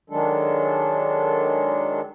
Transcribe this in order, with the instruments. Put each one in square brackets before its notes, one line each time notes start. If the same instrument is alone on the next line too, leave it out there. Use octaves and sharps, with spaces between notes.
[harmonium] D#3 F#3 G#3 D4 A4